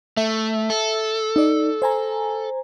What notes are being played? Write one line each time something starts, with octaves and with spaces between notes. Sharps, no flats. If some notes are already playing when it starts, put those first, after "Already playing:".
A3 E5
A4
D#4 D5
C5 G#5 A#5